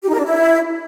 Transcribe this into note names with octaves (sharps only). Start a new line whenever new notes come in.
G4
D#4
A#4
D4
E4